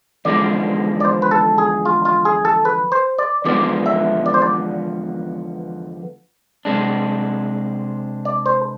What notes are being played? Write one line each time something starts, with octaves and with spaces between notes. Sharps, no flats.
E2 D3 F3 G#3 D5
D5
C5
B4
A4
G#4
F4
F4
G#4
A4
B4
C5
D5
E2 D3 F3 G#3 B3 D5
E5
D5
C5
D5
C3 G#3 D4
D5
C5